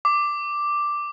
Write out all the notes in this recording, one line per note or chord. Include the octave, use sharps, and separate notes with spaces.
D6